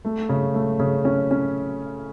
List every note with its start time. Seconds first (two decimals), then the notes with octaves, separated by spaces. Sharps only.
0.05 A3
0.29 C#3
0.54 A3
0.80 C#3
1.05 C#4
1.31 C#4